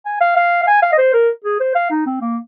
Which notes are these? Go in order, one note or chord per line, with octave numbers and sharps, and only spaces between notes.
G#5
F5
F5
F5
G#5
F5
D#5
C5
A#4
G#4
C5
F5
D#4
C4
A#3